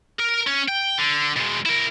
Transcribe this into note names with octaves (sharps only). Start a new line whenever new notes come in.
A#4
C#4
G5
D3
B2 G#3
E4 A#4